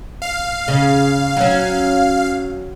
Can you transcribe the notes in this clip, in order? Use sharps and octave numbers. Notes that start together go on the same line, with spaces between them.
F5
C#3
F#3 C#4